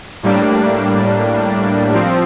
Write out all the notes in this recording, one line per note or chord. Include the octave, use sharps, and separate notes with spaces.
A2 G3 A#3 D4
F3 C4